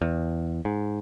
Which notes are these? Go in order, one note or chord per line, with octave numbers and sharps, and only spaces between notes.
E2
G#2